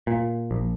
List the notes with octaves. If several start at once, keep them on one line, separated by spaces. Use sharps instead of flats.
A#2
A#1